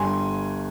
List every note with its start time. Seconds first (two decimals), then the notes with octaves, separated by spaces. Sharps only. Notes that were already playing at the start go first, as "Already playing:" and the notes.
Already playing: G1 G2 G3 G#5 C6